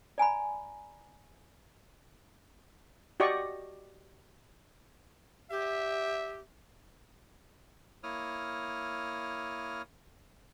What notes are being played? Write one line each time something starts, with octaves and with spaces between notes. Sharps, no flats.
D5 G#5 A#5 B5
F#4 G4 D5 D#5 C#6
G4 E5
A#3 E4 C#5 D#6 F6